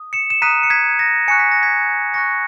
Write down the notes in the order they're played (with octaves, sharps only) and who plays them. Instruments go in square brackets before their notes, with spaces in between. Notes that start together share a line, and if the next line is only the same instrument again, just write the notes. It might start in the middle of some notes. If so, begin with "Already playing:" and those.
Already playing: [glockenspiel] D#6
C#7 E7
E7
A#5 D#6 F#6 B6 D#7
C#7
G#6 B6
A#6
G#5 C#6 F#6 C#7
B6
A#6
G#6 B6
G#5 C#6 F#6 A#6 C#7